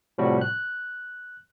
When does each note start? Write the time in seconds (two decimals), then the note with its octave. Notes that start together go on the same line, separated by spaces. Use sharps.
0.18 A2 C3 F3 G3 F#4
0.41 F#6